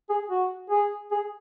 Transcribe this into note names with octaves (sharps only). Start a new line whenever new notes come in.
G#4
F#4
G#4
G#4